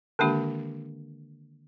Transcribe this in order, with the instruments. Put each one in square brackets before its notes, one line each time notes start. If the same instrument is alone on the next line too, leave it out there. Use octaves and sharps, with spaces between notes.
[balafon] D3 D#3 G#3 A#3 D4 G4